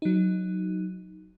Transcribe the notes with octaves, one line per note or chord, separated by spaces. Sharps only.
F#3 D#4